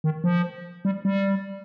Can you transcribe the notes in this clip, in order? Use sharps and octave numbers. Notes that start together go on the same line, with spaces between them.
D#3
F3
G3
G3